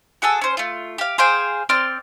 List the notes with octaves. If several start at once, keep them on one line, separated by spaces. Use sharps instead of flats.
F#4 G#4 A4 E6
C#4 C5
A3 F4
G4 F5
G#4 C5 F5 G5
C4 D5 C6 F6